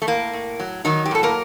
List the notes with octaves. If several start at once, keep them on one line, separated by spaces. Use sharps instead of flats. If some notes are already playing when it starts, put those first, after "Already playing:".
A3
A2 A#3
A2
F#3
D#3 F#3 D#4
G4
A2 A4
A#3 A#4